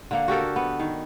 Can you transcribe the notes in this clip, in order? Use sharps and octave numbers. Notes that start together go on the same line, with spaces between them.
D3 A#3 F#5
F#4 G4 A4 A#4
B3
D#3